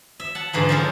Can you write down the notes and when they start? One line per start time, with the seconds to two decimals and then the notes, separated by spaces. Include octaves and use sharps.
0.20 E5
0.35 F#5 A5
0.53 G#2 D3 E3 F3
0.69 F3 G#3 C#4 A4 A#4